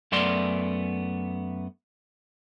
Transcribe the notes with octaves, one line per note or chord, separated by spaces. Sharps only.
F#2 A3 B3 D5 C6